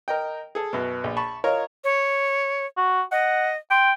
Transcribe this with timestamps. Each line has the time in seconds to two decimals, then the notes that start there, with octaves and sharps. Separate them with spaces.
0.08 A#4 D#5 G5
0.55 G#4 A4
0.73 F#2 B2
1.04 A#1
1.17 A5 B5 C#6
1.44 F4 A#4 C#5 D#5
1.84 C#5
2.77 F#4
3.12 D#5 F#5
3.71 G5 C6